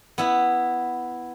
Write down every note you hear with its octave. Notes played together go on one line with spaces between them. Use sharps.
B3 E4